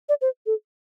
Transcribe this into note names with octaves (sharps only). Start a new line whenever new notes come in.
D5
C5
A4